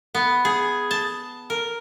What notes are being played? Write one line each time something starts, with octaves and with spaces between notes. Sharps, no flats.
B3
G#4
A5
A#4